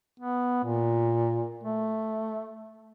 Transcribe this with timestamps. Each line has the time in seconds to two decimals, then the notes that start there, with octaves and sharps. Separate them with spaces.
0.20 B3
0.64 A#2
1.64 A3